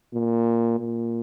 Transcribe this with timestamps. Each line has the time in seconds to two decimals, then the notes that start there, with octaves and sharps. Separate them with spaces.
0.13 A#2
0.79 A#2